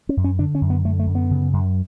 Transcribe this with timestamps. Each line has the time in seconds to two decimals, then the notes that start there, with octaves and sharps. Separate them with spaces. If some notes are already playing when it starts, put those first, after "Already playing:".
0.09 C#4
0.17 F#2
0.24 C#4
0.39 D3 D4
0.55 C#4
0.61 F#2
0.70 B3
0.85 D3 A3
0.99 A3
1.07 F#2
1.15 B3
1.31 C#3
1.53 F#2